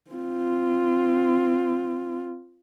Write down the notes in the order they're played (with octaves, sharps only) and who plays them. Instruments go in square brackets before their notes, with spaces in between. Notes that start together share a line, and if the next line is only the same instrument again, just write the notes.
[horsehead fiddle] C4 F4